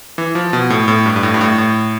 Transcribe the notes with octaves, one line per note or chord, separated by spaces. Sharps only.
E3
F3
B2
A2
A2
G2
G2
A2
G2
A2
A2